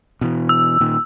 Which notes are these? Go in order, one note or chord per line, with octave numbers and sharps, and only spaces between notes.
B2 E3
E6
A#2 D#3